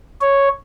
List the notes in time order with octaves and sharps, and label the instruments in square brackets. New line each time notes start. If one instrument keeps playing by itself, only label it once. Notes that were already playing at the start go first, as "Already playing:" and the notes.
[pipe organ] C#5